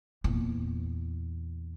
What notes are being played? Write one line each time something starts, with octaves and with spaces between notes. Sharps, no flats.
E2 A#2